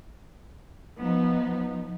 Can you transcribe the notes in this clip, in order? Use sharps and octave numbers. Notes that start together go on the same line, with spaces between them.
F3 B3 D#4